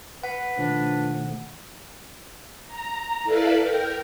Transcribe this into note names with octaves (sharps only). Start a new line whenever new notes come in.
B4 F#5
B2 D#3 F3 A3 D4
A#5
E4 A4 B4 D5 F5
A#4 G5